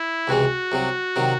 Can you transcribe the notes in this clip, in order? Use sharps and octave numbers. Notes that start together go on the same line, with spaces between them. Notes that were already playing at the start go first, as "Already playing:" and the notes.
Already playing: E4
C#2 C3 E3 G#3 F#4
C2 C3 F#3
C3 D#3 F#3